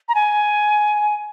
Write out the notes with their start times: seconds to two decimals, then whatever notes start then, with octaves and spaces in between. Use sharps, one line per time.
0.09 A#5
0.15 G#5